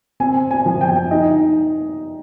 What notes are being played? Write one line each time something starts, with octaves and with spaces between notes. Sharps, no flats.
C4 G#5
G#5
F3
G5
D#4 D#5